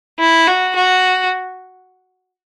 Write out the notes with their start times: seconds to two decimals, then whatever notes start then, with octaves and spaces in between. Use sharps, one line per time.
0.19 E4
0.47 F#4
0.75 F#4